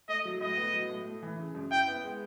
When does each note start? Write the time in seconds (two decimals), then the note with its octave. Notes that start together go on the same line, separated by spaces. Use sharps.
0.08 A3 D#5
0.25 F#3
0.41 A2 D#5
0.57 B3
0.74 F#3
0.89 A2
1.07 A3
1.23 E3
1.39 C#3
1.55 F#2
1.71 E4 G5
1.88 B3
2.04 G#3